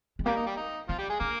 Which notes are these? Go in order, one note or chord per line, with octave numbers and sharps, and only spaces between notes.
G#3
G3 A#3 G4
D#4
G3 G4
D#4
F3 C4 F4
G3 G4
G#3 G#4
A#3 D4 A#4